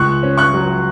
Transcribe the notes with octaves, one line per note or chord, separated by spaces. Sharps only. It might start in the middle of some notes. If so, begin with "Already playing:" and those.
Already playing: C#2 C#6 F#6
C#4
C#6 F#6
F#3